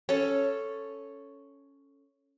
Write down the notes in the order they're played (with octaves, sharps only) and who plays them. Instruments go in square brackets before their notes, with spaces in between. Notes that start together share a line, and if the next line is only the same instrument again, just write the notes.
[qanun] C#4 A4